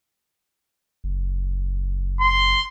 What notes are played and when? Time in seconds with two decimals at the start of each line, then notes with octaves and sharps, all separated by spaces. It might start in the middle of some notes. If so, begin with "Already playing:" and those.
1.04 F#1
2.21 C6